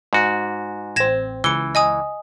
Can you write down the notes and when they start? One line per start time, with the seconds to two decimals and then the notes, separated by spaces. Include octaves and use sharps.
0.13 G#2 F#4
0.96 A1 C4 G#6 A#6 E7
1.44 C#2 E3 C#7 G7
1.75 D#5 G#5 D#6